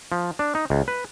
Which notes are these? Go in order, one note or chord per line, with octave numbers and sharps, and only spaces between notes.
F3
D4
D#4
C#2
B4